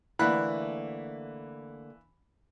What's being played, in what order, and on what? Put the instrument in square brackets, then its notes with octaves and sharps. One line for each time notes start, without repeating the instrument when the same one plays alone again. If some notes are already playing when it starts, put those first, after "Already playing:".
[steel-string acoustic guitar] D3 A3 A#3 [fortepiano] E3 B5 F#6